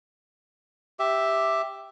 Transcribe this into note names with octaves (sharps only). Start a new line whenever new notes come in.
G4 E5